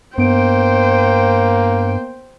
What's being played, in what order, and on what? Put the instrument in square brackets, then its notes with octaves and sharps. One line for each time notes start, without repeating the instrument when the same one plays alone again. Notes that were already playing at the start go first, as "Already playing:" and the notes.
[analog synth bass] G2 [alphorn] A#3 [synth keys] B3 D7 [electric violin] C5 G5